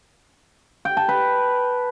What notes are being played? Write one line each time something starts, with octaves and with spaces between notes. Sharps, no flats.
G5
A5
B4